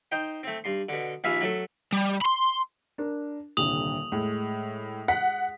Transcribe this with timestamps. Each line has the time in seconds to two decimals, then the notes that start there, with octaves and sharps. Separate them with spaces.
0.12 D#4 C5 G5
0.43 A3 C4
0.64 G2 C6
0.89 B2 D3
1.24 A#1 D#2 E5 F5 G#5 B5
1.41 F#3 A3 A4
1.92 G3
2.22 B5 C6
2.98 D4 A#4
3.57 D#1 C2 D3 D#6 F7 F#7
4.12 A2 G#3
5.08 F#5 B6